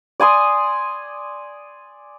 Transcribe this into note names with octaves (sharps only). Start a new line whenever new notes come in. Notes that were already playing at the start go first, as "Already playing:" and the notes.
D5 G#5 C6 D#6